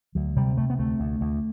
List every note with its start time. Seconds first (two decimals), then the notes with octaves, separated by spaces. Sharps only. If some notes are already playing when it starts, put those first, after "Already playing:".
0.15 D2 F#3
0.36 C3 G3
0.57 C3 A3
0.70 B3
0.79 D2 A3
1.00 D2
1.21 D2